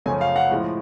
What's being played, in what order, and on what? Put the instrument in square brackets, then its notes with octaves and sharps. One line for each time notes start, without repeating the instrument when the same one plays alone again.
[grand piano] F#2 C#3 F3 A3 C#4 G#5
F5
F#5
A2 F3 G#3